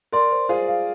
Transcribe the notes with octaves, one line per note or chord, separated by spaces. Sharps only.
A#4 D5 C6
C5
F4 G#4 C5
F5